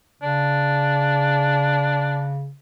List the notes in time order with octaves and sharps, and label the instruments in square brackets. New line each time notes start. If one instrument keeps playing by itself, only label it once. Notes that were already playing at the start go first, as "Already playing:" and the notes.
[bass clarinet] C#3 [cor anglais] D4